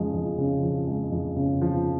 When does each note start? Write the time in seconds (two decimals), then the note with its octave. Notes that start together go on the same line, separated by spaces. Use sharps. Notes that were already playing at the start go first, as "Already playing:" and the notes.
Already playing: F2 C#3 F3 G#3
0.14 F2
0.38 C#3
0.63 F3
0.87 G#3
1.12 F2
1.36 C#3
1.61 F3